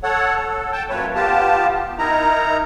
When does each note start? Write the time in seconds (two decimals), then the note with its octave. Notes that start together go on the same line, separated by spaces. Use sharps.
0.03 A4 C#5 F#5
0.36 A4
0.73 G5 A5
0.90 F#2 A#2 A3 B4 C#5
1.15 B3 F4 G4 A5
1.99 D#4 E4 A#4 A#5